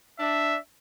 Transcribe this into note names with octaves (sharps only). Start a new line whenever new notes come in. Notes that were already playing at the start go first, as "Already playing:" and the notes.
D4 E5